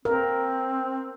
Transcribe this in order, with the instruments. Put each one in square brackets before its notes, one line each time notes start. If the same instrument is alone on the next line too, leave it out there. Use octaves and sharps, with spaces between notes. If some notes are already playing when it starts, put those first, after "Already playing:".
[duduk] C4 [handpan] A#4